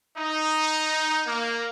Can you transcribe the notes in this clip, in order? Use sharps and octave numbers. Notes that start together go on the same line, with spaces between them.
D#4
A#3